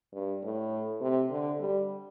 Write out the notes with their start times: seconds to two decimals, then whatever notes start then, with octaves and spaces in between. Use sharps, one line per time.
0.14 G2
0.43 A2
1.01 C3
1.31 D3
1.60 G3